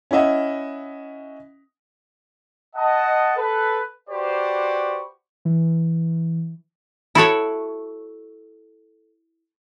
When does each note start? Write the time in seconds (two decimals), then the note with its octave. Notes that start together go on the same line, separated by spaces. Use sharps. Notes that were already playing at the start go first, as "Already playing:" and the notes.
0.11 C#4 E4 D#5 E5 F#5
2.76 D#5 F#5 A5
3.36 A4 B4
4.10 F#4 G4 B4 C5 D5 C#6
5.45 E3
7.15 E4 F#4 A4 C#5